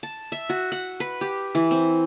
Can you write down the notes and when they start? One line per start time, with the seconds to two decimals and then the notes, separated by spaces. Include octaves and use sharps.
0.03 A5
0.32 E5
0.49 F#4
0.72 F#5
1.00 B4
1.21 G4
1.55 E3
1.71 C4